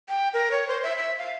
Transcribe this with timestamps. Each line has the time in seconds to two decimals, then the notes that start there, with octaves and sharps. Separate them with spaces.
0.09 G5
0.34 A#4
0.51 C#5
0.68 C5
0.83 E5
0.97 E5
1.18 F5